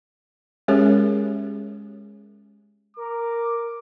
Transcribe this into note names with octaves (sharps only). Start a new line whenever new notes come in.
G#3 C#4 G4 G#4 A#4 C#5
A#4 D6